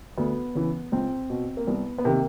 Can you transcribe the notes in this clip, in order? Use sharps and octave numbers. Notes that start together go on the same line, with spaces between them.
D2 B3
C#3 E3
C#2 C4
B2
A#3
C2 B3
B3
C3 D#3 A#3